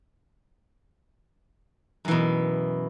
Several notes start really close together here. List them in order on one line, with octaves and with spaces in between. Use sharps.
F#2 E3 B2